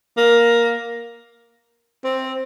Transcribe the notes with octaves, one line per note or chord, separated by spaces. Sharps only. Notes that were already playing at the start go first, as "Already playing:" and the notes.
A#3
C4